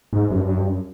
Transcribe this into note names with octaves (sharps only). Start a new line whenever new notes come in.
G#2
F#2
G2
F#2
G2
F#2